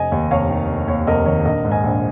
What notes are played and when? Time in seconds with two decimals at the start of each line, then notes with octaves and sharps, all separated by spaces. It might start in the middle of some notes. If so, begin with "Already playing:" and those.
Already playing: F1 D#5 G#5
0.12 D#2
0.31 F1 C#5 F5
0.50 D#3
0.69 F1
0.88 D#2 C#5
1.07 F1 A#4 D#5
1.26 D#3 C#5
1.45 A#1 A#4 D#5
1.64 G#2
1.71 D#5 G#5
1.84 A#1